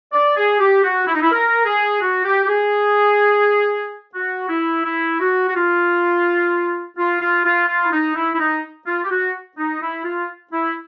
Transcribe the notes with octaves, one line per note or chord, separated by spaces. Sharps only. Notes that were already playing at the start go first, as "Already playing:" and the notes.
D5
G#4
G4
F#4
E4
D#4
E4
A#4
G#4
F#4
G4
G4
G#4
F#4
E4
E4
F#4
F#4
F4
F4
F4
F4
F4
E4
D#4
E4
E4
D#4
F4
G4
F#4
D#4
E4
F4
E4